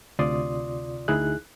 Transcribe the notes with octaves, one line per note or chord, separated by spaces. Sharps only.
D2 C3 F4 D5 C6 D#6
D2 D#4 E4 G#4 F#6